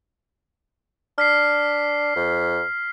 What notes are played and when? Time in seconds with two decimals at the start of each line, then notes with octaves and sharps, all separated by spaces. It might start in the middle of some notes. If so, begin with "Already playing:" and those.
1.18 D4 F6 B6 C7
2.16 F2